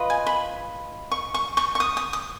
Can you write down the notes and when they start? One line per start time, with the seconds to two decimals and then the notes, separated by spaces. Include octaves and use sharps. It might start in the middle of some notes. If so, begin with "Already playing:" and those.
Already playing: F4 B4 D#5
0.10 G#5
0.27 B5
1.12 C#6
1.34 C#6
1.57 C#6
1.75 C#6
1.80 D#6
1.97 D#6
2.13 D#6